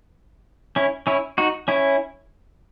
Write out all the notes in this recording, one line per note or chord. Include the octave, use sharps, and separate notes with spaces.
C#4 E4
C#4 E4
D#4 F#4
C#4 E4